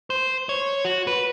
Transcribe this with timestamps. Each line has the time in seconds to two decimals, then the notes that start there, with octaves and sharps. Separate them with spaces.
0.10 C5
0.49 C#5
0.85 F#4
1.07 B4